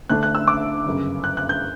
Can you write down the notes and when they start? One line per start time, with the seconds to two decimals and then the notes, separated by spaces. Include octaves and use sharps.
0.10 D2 D3 A3 D4 F#6
0.23 F#6
0.35 E6
0.48 D6
0.86 G1 F#2 C#3
1.24 F#6
1.37 F#6
1.49 G6